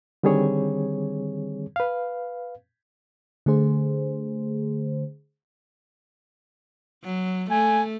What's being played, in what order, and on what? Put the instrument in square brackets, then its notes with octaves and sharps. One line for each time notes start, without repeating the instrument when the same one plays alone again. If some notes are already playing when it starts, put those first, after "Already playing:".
[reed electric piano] D3 D#3 G3 C4 G#4 C#5
B4 F5
[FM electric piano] D3 A3 G#4 C5
[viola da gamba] F#3
[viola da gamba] A3 [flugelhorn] G#5